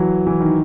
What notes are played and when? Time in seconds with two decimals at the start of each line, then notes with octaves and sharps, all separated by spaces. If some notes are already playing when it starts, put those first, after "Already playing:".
Already playing: E3 F#3
0.27 E3
0.40 D#3